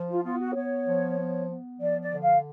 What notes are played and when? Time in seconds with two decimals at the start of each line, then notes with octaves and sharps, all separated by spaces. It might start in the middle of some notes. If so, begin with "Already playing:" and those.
Already playing: F3
0.09 F4
0.24 B3 F4
0.40 F#4
0.55 B3 C#5
0.87 F3
1.18 B3
1.49 B3
1.80 F3 D5
2.01 D5
2.12 D3
2.22 F5